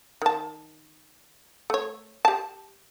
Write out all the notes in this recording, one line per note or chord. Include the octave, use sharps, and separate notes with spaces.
D#3 A5
A3 C#5
G4 A5